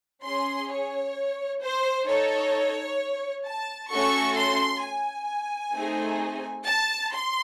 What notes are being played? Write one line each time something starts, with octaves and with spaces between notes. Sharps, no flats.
C#4 G#4 C6
C#5
C5
D#4 A4 C#5
A5
A3 C#4 F#4 A4 C#6
C6
G#5
A3 C4 D#4 G#4
A5
C6